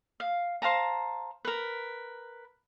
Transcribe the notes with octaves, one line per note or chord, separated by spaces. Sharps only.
F5
C5 F5 A5 A#5
A#4 B4